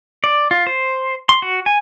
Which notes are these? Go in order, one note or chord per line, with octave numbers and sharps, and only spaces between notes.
D5
F4
C5
C6
F#4
G#5